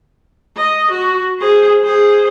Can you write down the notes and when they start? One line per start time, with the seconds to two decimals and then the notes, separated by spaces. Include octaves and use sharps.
0.56 D#5
0.90 F#4
1.39 G#4 C5
1.84 G#4 C5